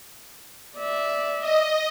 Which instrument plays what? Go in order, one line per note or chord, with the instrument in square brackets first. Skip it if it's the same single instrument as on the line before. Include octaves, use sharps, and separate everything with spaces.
[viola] D5 E5
[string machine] D#5